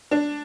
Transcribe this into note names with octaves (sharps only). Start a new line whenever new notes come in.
D4